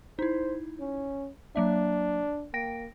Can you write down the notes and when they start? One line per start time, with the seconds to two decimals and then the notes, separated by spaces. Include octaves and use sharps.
0.19 D#4 E4 C5
0.80 C#4
1.56 F#3 A#3 D4 E5
2.54 A#3 G5 A#6 D7